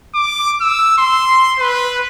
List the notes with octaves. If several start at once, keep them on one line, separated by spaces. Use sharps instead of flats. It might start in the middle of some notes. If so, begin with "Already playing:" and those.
D6
E6
C6
B4